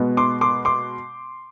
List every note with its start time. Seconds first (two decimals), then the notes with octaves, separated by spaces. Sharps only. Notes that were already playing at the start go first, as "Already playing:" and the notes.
Already playing: B2 G#3 B3
0.17 C6 D6
0.41 C6 D6
0.65 C6 D6